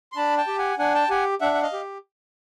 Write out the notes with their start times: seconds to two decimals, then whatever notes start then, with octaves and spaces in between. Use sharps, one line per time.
0.12 C6
0.16 D4 A5 B5
0.37 G5 A5
0.47 G4
0.59 F#5 G#5
0.79 D4 F#5 G#5
0.94 G5 A5
1.10 G4 F#5 G#5
1.41 D4 E5 F#5
1.54 F#5
1.62 D#5 F5
1.73 G4